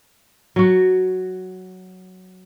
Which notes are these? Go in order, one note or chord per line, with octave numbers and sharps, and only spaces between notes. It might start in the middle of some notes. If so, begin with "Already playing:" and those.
F#3 F#4